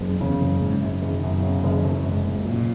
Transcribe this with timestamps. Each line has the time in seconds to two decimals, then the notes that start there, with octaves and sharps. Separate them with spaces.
0.01 F#1 F#2
0.21 E2 C#3
0.41 F#1 F#2
0.61 F#1 G#2
0.82 F#2
1.02 F#1
1.09 D#3
1.23 F#2
1.36 B2
1.43 C#3
1.64 F#1 D#3
1.84 F#1
2.04 F#1 G#2
2.25 F#1 G#2
2.40 B2
2.45 F#1 A#2